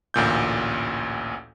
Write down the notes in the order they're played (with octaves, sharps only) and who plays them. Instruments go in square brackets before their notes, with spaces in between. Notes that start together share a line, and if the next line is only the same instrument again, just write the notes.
[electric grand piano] A1 D2 A#2 G6